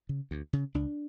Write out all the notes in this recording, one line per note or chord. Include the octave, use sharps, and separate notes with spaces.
C#3
D2
C#3
C#2 D4